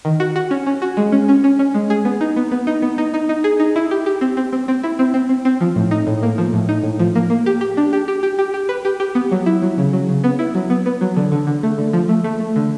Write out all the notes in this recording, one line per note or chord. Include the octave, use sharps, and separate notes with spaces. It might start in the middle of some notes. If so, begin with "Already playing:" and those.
D#3
F#4
F#4
C#4
C#4
F#4
G#3
C#4
C#4
C#4
C#4
G#3
G#4
B3
D#4
B3
B3
D#4
B3
D#4
D#4
D#4
G#4
D#4
E4
G4
G4
C4
C4
C4
C4
E4
C4
C4
C4
C4
F3
A2
D#4
A2
A#3
F3
A2
D#4
A2
F3
A#3
A#3
G4
G4
D4
G4
G4
G4
G4
G4
B4
G4
G4
B3
F#3
E4
F#3
C#3
F#3
C#3
B3
E4
F#3
B3
B3
F#3
D3
D3
D3
A3
D3
F3
A3
A3
A3
D3